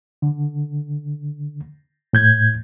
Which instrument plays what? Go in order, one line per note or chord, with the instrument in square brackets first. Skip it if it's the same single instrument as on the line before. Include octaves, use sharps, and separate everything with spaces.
[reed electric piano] D3
A2 G6 G#6